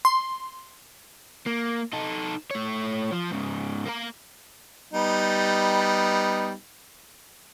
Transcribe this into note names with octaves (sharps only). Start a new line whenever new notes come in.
C6
A#3
D#4 A4
A3 C#5
F3
G#2 C#3
A#3 A#4
G3 B3 D#4